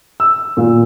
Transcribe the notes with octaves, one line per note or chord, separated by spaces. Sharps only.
E6
A#2